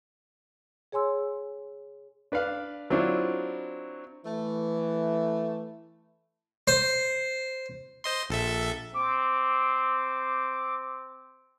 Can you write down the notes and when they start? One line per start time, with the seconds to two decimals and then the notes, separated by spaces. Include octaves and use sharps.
0.92 G#4 C#5 G#5 C6 E6
2.32 D4 B4 D5 F5
2.90 F#3 C4 D4 E4 F4
4.26 E3 A3
6.68 C5
8.04 C5 D#5 C6
8.29 A#1 A4 E5
8.94 C4 D6